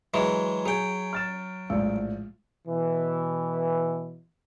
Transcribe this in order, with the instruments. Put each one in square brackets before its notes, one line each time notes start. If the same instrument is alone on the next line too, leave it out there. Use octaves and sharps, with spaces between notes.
[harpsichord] E3 F#3 G#3 [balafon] E5
[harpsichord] F#3 G5 [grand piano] G#4
[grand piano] F6 A6 E7
[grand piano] A#1 A2 [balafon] G#3
[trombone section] B2 E3